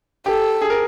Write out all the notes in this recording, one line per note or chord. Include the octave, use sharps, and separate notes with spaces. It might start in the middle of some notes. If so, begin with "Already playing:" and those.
G4 A4
G#4
A#4